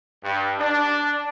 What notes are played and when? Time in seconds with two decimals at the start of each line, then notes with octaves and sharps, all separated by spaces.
0.24 G2
0.59 D4